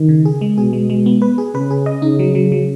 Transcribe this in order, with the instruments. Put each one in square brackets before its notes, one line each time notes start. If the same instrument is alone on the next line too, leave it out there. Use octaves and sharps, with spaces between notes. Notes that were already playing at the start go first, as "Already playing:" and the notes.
Already playing: [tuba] D#3
[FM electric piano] C#3
G#4
G#3
[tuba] B2 [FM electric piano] G#4
[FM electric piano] G#3
G#3
B3
B4
G#4
[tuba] C#3 [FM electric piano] B4
[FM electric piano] G#4
D#5
[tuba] C#3 [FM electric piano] D#4
[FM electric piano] F#3
F#3
F#3